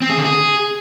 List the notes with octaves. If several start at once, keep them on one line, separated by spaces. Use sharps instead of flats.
C4
G#4
D3
G#4